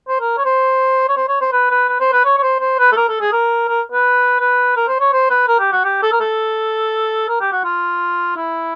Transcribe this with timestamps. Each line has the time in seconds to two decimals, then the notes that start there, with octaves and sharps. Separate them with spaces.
0.08 C5
0.21 A#4
0.37 C#5
0.45 C5
1.09 C#5
1.17 C5
1.28 C#5
1.41 C5
1.52 B4
1.71 B4
1.89 B4
2.00 C5
2.13 B4
2.25 C#5
2.38 C#5
2.43 C5
2.60 C5
2.79 B4
2.92 A4
2.97 A#4
3.09 A4
3.21 G#4
3.32 A#4
3.68 A#4
3.92 B4
4.40 B4
4.76 A#4
4.88 C5
5.00 C#5
5.13 C5
5.30 B4
5.48 A#4
5.60 G4
5.72 F#4
5.84 G4
6.03 A4
6.12 A#4
6.20 A4
7.28 A#4
7.41 G4
7.52 F#4
7.64 F4
8.36 E4